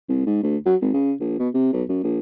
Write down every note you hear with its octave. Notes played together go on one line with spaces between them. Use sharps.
C2
G#2
D2
F#3
G#1
C#3
A#1
B2
C3
B1
F#2
A#1